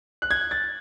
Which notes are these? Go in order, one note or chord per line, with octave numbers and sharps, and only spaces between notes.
F#6
G#6
A6